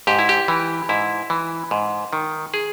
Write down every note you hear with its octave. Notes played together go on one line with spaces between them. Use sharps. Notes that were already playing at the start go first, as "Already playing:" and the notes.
G#2 G4
E4
G4
E3
G#2 E4
E3
G#2
D#3
G#4